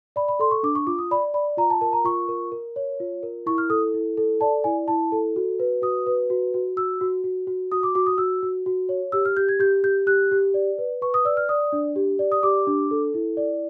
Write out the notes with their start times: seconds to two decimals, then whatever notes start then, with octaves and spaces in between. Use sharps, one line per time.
0.16 D5 B5
0.28 B5
0.39 A4 C6
0.51 C#6
0.63 D4 D6
0.75 C#6
0.87 F4 D6
0.98 D#6
1.11 D5 B5
1.34 D5 B5
1.57 F4 A#5
1.70 A5
1.81 A#4 A5
1.93 A#5
2.05 F4 C#6
2.28 A#4
2.52 A#4
2.76 C#5
3.00 F4
3.23 A#4
3.46 E4 C#6
3.58 F6
3.70 A4 D#6
3.94 E4
4.17 A4
4.41 D5 A5
4.64 E4 G#5
4.88 E4 A5
5.12 A4
5.36 F#4
5.60 B4
5.82 F#4 D#6
6.06 B4
6.30 F#4
6.54 F#4
6.77 F#4 E6
7.01 F#4
7.24 F#4
7.47 F#4
7.72 F#4 D#6
7.83 D6
7.95 F#4 D6
8.07 D#6
8.18 F#4 E6
8.43 F#4
8.66 F#4
8.89 C#5
9.12 G4 E6
9.25 F6
9.37 G4 G6
9.49 G#6
9.60 G4 G6
9.84 G4 G6
10.07 G4 F#6
10.31 G4
10.54 D5
10.78 B4
11.02 B4 C#6
11.14 D#6
11.25 D5 E6
11.37 F6
11.49 D5 D#6
11.73 D4
11.96 G4
12.19 D5
12.32 D#6
12.43 G4 D6
12.67 D4
12.91 A4
13.14 E4
13.37 D5